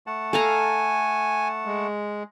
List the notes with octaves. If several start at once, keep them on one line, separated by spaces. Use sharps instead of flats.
A3 F#5 A5
A4 F5 G#5 A#5
G#3